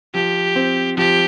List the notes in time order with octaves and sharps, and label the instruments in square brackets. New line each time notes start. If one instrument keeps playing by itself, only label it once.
[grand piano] F3 [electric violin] G4
[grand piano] C4
[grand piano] F3 [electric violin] G4